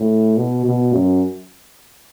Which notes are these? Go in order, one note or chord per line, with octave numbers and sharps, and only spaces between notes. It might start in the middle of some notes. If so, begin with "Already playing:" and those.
Already playing: A2
B2
B2
F#2